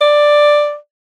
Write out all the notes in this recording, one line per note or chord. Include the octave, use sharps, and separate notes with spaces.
D5